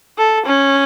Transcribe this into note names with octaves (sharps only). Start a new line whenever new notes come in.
A4
C#4